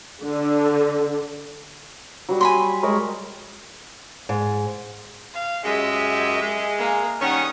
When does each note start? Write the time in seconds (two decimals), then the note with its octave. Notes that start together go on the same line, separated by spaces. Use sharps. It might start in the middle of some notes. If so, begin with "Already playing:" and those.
0.24 D3
2.29 F#3 G3
2.41 G#5 B5 C6
2.83 G#3 A#4 C#5
4.29 G#2
5.34 F5
5.64 F#2 G#3 G4 E5
6.42 G#3
6.78 A#3 G#4
7.22 D#3 G3 C#4 F#5 D#6